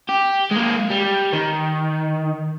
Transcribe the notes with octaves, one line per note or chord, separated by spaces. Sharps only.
G4
G#3 A#3
G3
D#3